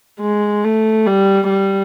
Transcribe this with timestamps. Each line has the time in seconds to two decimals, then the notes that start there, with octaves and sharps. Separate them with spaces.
0.20 G#3
0.64 A3
1.07 G3
1.49 G3